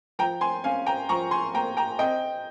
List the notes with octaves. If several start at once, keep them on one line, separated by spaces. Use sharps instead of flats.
F3 G5 A#5
G#5 C6
C#4 F5 G#5
G5 A#5
F3 A#5 C#6
G#5 C6
A#3 G5 A#5
G5 A#5
C4 D#5 G5